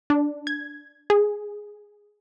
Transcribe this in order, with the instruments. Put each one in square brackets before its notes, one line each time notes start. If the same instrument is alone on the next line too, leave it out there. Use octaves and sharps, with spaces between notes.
[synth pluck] D4
G#6
G#4